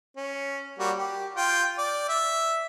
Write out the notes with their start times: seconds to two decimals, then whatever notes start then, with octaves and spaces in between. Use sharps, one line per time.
0.17 C#4
0.79 G3 A#3 F#4
0.98 G4
1.36 F4 G5
1.78 D5
2.09 E5